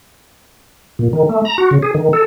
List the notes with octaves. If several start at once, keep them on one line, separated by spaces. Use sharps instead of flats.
A#2
D#3
A3
A#5
F#4
C#3
G#4
D#3
A4